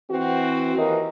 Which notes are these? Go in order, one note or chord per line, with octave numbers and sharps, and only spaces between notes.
E3 C4 F#4
D#2 E3 A#4 D#5